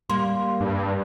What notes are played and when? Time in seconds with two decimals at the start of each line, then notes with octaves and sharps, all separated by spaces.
0.10 G3 A#3 C6
0.61 G2